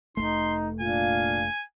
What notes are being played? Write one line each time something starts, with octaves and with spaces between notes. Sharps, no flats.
F1 D#2 A3 D#4 C6
A#2 D4 F4 F5 G#5